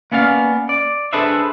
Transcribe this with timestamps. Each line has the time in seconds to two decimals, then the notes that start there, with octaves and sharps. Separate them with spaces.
0.12 A#3 B3 C#4 D5 F5
0.69 D5
1.13 D4 G#4 A4 B4 C5 E5